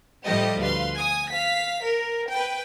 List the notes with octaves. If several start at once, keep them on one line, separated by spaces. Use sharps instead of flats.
A2 F3 G3 A3 G4 D#5
D2 B4 F5 C6
G#5 D#6
F5 B6
A#4
B4 G5